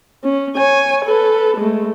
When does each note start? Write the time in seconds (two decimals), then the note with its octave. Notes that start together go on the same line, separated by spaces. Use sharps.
0.24 C#4
0.57 C#5 G#5
1.05 A4 B4
1.57 G#3 A3